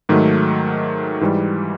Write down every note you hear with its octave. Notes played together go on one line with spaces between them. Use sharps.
G#2 D#3 F#3 A3
G#2 E3 G3